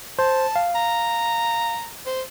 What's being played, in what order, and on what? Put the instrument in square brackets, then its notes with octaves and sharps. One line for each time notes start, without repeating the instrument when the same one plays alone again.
[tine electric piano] C5 [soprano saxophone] A5
[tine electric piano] F5
[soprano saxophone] A#5
C5